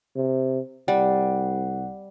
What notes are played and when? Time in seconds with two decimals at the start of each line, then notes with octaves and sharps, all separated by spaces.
0.16 C3
0.88 C2 G3 F#5